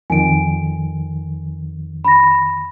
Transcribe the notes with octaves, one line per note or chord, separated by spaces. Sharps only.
F2 D#3 G#5 D7
B5 A#6